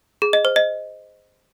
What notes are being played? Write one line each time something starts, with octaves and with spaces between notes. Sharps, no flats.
G#4
D#5
C5
D#5